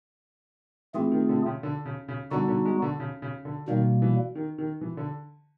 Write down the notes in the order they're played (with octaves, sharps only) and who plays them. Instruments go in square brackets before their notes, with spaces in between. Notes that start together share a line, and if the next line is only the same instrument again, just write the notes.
[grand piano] E3 [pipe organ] A3 C4 F4 G#4
[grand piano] D#3
D3
C#3
D3
C#3
C#3
[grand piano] D3 [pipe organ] G3 B3 D#4 F#4
[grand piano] D3
G#3
D3
C#3
C#3
D3
[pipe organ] B2 G3 A#3 [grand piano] D#3
[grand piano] E3
D#3
D#3
E3
D3